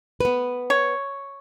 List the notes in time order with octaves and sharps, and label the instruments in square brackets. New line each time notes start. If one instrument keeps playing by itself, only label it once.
[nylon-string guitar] B3 B4
[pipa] C#5